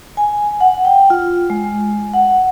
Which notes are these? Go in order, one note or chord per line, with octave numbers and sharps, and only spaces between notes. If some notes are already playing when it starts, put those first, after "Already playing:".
G#5
F#5
G5
F4
G#3
F#5